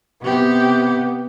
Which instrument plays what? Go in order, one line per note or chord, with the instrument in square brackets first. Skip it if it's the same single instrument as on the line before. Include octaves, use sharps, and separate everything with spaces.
[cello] C3 G4 [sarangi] B3